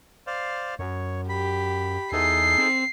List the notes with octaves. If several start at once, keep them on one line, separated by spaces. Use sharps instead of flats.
C5 D5 F5
F#2 C#5
G4 B5
E2 D#4 G#4 A4 C7
C4